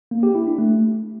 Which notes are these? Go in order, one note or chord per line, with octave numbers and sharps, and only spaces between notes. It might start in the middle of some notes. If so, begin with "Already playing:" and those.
A#3
G4
E4
D4
A3